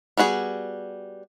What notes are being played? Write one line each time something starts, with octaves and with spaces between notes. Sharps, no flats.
G3 B3 F#4 G#4